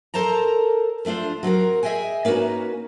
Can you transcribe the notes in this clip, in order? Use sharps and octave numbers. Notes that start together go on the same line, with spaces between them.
A4 A#4 C5 A5 A#5
F3 A3 D4 F4 C5
F#3 C4 F#4 A#4
G#4 D#5 E5 G5 G#5
A#3 C#4 D#4 F#4 B4